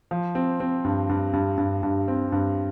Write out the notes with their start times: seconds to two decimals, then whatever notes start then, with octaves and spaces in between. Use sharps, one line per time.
0.11 F3
0.35 C4
0.60 C4
0.84 G2
1.09 G2
1.33 G2
1.58 G2
1.83 G2
2.08 C4
2.32 G2